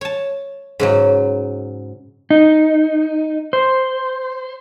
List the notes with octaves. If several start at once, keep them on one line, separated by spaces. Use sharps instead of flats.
C#5 A5
G#2 C#3 F#3
D#4
C5